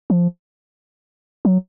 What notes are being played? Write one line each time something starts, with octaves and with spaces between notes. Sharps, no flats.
F3
F#3